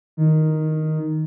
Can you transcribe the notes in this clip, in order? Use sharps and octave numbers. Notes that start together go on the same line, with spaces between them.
D#3